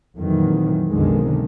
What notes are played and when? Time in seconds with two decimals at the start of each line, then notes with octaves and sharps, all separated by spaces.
0.18 F2 A#2 D#3 E3 F#3
0.91 B1 F2 D3 D#3 F3 G#3